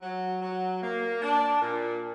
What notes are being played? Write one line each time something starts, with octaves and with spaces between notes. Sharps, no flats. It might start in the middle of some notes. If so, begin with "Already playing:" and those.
F#3
F#3
A#3
D4
A#2